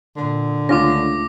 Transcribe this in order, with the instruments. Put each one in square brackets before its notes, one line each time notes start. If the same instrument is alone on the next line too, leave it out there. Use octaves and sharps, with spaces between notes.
[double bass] A#2 [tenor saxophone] D3
[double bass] C#2 A3 [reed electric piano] C#4 D4 F4 [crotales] D6 A#6